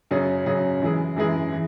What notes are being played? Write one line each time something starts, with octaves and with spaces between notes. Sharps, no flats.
F#2 C#3 F#3 C#4 G#4
F#2 C#3 F#3 C#4 G#4
F#2 E3 G#3 E4 G#4
F#2 E3 G#3 E4 G#4
E3